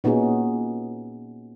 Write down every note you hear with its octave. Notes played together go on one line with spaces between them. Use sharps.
A#2 B3 C#4 D#4 F#4 G#4